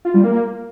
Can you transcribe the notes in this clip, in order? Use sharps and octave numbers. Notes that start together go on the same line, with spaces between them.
F4
G3
A#3